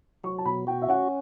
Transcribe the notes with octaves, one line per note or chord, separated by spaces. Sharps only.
F#3 C#6
A5
B2 B5
F#4 G5
E5
C#4 F#5